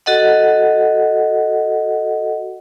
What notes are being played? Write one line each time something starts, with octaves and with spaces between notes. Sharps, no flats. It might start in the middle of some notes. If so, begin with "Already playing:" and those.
F#4 A4 D#5 F#5